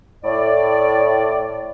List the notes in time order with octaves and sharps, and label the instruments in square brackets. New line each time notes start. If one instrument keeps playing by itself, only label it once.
[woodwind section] A2 D5